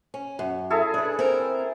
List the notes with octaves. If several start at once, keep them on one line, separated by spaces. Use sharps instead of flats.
C#4
F#2
E4 G#4 A4
D4 B4
C4 A#4